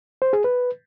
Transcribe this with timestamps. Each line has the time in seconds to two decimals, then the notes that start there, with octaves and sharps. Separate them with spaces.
0.22 C5
0.33 G#4
0.44 B4